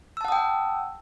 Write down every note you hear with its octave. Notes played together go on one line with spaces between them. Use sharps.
F#5 G5 A5 D#6 E6